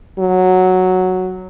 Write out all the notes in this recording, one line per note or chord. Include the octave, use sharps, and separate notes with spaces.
F#3